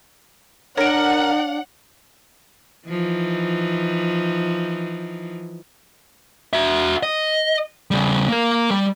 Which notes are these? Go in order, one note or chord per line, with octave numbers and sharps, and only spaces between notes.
D4 A#4 C#5 F#5 A#6 D7
E3 F3 D#4
F#4 E5
D#5
C#3 G3
A#3 A#4
G3